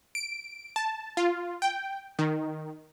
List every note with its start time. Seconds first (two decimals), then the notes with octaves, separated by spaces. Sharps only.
0.15 D7
0.76 A5
1.17 F4
1.62 G5
2.19 D#3